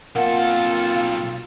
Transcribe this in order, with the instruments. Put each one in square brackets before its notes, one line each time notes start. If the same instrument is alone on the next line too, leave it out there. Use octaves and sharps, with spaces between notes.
[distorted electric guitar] B1 A4 [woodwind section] A#3 C4 F4 [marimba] A#4 F#5 [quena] F5